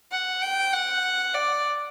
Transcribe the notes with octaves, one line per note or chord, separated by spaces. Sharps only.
F#5
G5
F#5
D5